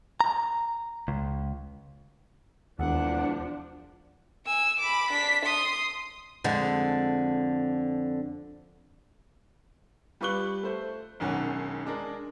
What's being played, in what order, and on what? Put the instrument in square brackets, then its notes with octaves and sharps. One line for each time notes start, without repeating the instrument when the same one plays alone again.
[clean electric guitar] A#5
C#2
[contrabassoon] E1 [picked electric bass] D#2 [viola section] F3 D4 [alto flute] F#5
[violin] G#5 E6
B5 D6
D4 B6
C6 D#6
[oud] F2 D3 G#3
[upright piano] G3 F4 B4 C#6 F#6 G7
A3 C5
E1 B1 D#3 C#4 F#5
G#3 D4 A#4